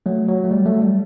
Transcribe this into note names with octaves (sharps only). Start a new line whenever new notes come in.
F#3 A3
F#3
A3
G3
F#3 A3
G3